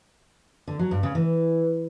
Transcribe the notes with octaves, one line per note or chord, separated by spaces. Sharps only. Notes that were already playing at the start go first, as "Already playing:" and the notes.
D3
F#3
G2
C#3
E3